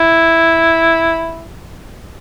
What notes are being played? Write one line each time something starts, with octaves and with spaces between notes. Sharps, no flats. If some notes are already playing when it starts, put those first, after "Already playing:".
Already playing: E4